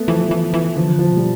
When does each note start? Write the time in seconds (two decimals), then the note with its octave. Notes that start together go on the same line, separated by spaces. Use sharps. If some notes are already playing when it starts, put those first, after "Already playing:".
Already playing: A3 B3
0.08 E3 F3
0.31 E3
0.54 E3
0.76 D3 F3
0.99 F3
1.11 B2
1.17 G3